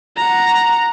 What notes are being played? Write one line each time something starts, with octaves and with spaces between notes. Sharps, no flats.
F#5 A#5